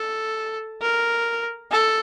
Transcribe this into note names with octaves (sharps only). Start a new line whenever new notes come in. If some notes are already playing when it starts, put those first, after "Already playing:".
Already playing: A4
A#4
A4